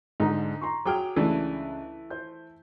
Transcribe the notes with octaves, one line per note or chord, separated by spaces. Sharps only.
G#2 D3 D#4
A#5 C6 C#6
F#3 G#4 G5 D6 F6
C#2 C#3 E3 A3 D4
C5 G6